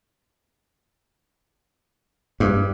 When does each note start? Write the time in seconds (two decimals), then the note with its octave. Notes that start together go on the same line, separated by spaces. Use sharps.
2.40 G2